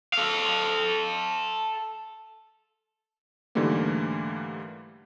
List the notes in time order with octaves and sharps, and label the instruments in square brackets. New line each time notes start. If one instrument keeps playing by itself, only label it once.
[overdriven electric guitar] A4 F5
[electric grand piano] G#2 D3 E3 G3 A3 A#3